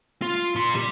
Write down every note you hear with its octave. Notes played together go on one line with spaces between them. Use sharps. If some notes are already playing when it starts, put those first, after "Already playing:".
F4
A#2 C6
G3 G4